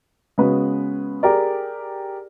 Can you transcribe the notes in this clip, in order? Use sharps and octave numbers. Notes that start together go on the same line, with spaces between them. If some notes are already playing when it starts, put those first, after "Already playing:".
C#3 G#3 B3 F#4 B4
G4 G#4 A#4 D5